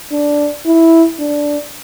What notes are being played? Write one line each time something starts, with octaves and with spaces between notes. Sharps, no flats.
D4
E4
D4